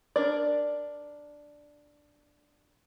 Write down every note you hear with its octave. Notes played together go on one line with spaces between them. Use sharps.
D4 A#4 D5